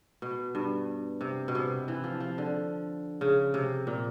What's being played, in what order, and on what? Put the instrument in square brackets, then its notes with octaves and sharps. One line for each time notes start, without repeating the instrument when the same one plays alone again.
[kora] B2
G2
C3
B2
C3
E3
F3
F3
D3
C#3
C3
A#2